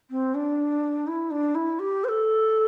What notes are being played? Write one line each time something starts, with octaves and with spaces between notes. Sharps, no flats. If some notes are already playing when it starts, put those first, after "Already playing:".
C4
D4
E4
D4
E4
G4
C5
A4